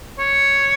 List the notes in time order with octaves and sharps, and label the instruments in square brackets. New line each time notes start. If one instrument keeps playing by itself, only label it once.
[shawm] C#5